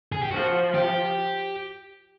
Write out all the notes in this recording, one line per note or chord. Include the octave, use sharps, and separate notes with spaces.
G#4
G4
F3 F#4
G4